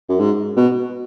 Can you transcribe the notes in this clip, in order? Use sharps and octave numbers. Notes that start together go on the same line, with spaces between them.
F#2
G#2
B2